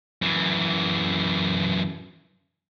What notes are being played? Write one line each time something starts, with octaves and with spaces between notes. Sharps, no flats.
F#2 E3